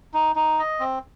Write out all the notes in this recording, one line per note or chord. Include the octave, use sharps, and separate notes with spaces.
D#4
D#4
D#5
C4